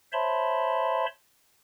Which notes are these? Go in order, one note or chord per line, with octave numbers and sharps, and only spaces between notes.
C5 C#5 E5 A5 B5 C6